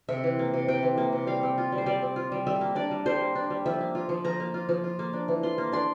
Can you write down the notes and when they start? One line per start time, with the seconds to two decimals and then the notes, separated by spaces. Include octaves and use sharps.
0.09 C3 E5
0.24 E3
0.39 A#3
0.54 C3
0.68 C3 G5
0.83 E3
0.98 A#3
1.13 C3
1.27 G3 F5
1.43 C4
1.58 F4
1.72 G3
1.78 C5
1.86 G3 D5
2.02 C4
2.16 F4
2.32 G3
2.47 G3 E5
2.61 A#3
2.75 D4 D5
2.91 G3
3.06 G3 C5
3.21 A#3
3.35 D4
3.50 G3
3.66 F3 E5
3.81 A#3
3.95 F4
4.09 F3
4.25 F3 A#5
4.40 A#3
4.54 F4
4.69 F3
4.84 F4
4.99 A#3
5.13 D4
5.28 E3
5.43 F4 C6
5.58 A#3
5.72 D4 C6